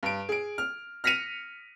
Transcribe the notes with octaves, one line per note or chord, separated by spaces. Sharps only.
G2 D7
G#4 D7
F6
F6 A#6 B6 C#7 D#7 F7